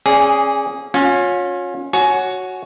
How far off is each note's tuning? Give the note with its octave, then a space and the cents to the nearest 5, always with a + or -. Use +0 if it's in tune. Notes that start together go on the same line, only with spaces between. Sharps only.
C#4 -25 G#4 +0 D5 -15
C#4 +0 F4 +40
F#4 +0 C#5 +0 G#5 +25